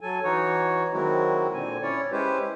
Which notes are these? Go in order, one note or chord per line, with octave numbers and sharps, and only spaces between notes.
F#3 A4 G#5
E3 D#4 F#4 C#5
D#3 F#3 G#3 C4 E4 F#4
A#2 D3 C4 G#5
C#4 E4 C#5 D5
G#3 C#4 E4 G4 B4 C5